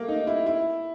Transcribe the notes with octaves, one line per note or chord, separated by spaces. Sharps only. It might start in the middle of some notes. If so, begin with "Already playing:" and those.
Already playing: A3 A#3
D#4
E4
E4